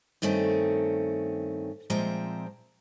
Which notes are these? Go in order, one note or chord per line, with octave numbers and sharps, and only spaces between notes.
G2 D#3 A3 C4 C#4
A#2 F3 G#3 C4 E5 A#5